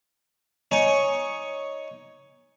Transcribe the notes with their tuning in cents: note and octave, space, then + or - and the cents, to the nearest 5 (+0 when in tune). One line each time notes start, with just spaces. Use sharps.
D#4 +0 C#5 +0 G#5 +10